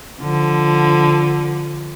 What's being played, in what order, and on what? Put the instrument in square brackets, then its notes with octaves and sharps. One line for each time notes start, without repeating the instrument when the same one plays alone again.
[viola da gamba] D3 F3